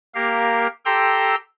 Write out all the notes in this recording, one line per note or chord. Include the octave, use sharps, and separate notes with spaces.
A#3 G4 A#4 F5
G4 A4 G5 A#5 C6 E6